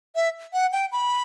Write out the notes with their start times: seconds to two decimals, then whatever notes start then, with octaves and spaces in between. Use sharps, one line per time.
0.16 E5
0.53 F#5
0.73 G5
0.92 B5